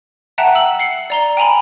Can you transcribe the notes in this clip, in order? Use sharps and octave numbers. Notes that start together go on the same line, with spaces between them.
E5 F#5 G5 A5 A#5 F#6
E6 F#7
C7 C#7
D5 A#5 G7
G5 G#5 A#5 B5